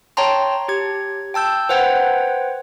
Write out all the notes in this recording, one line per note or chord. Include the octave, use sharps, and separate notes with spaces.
C#5 G5 A5 A#5 C6
G4 G#6
G5 A5 E6 G6
B4 C5 F#5 G5 G#6